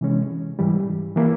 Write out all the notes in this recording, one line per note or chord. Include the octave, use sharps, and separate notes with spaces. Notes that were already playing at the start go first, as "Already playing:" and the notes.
C3 E3 G#3 C#4
G#2 E3 G3
E3 A#3 E4